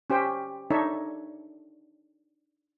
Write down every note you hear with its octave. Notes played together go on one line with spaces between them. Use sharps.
C#4 G4 C5 G5
D4 D#4 A4 C#5 E5